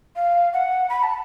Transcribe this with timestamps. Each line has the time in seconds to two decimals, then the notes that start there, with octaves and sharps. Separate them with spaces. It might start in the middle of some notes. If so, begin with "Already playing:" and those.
0.16 F5
0.53 F#5
0.90 B5
1.03 A5